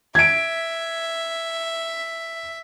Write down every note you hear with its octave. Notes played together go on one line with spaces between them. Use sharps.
E5 G#6 D7